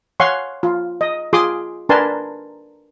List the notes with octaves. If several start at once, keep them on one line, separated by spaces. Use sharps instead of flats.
C#5 F5 F#5 G#5 C6 C#6
F4
D#5
F4 G#4 C6 D6 D#6
D4 A#4 B4 G#5 A5 C6